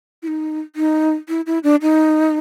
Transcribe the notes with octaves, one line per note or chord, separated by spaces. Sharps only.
E4
D#4
D#4
E4
E4
D4
D#4